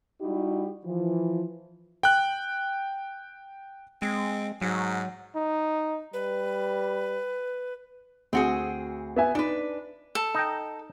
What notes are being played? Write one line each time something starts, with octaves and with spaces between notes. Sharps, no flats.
G3 D#4 E4 F#4 G4
E3 F3
G5 F#6
G#3 C4
G#2 F#3
D#4
G3 B4
D2 C4 F#4 G#4
B3 E5 G#5
D4 D#4 B4
A4
D#4 G5